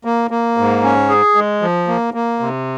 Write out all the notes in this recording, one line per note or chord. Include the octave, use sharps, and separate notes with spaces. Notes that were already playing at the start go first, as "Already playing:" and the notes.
A#3
A#3
G#2
C#4
G#4
G#3
F3
A#3
A#3
C3